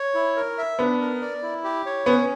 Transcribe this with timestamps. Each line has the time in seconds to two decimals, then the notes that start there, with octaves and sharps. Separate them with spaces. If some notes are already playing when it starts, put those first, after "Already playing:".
Already playing: C#5
0.15 E4
0.36 A#4
0.58 E5
0.79 B3 D4
1.01 A#4
1.21 D5
1.43 E4
1.64 G4
1.86 C#5
2.06 B3 C#4